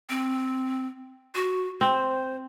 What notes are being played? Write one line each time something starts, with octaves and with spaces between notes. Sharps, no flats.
C4
F#4
C4 C5